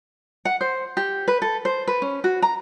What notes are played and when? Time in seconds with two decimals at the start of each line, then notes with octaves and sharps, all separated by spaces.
0.45 F#5
0.61 C5
0.97 G4
1.28 B4
1.42 A4
1.65 C5
1.87 B4
2.02 C#4
2.24 F#4
2.42 A#5